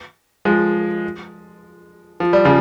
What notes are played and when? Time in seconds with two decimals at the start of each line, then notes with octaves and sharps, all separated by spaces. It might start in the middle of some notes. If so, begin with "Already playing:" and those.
0.45 F3 G#3
2.20 F3
2.33 G3
2.45 C#3 F3